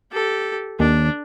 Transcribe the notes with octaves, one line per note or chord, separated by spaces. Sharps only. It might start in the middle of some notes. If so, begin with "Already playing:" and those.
G4 A4
D#2 D4